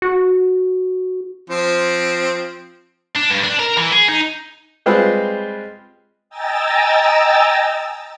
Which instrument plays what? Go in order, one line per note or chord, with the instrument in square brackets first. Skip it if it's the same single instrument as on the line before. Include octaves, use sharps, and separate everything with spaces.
[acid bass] F#4
[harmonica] F3 C4
[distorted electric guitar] D4
G2
D4
A#4
E3
G#4
D#4
[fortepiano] G3 G#3 C4 F4 B4 C5
[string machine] D#5 G5 G#5 A#5 E6 A6